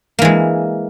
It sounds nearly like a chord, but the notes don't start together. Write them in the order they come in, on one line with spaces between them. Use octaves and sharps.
A#3 E3 G#3